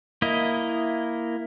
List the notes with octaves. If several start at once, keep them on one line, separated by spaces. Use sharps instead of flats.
A#3 E4 D#5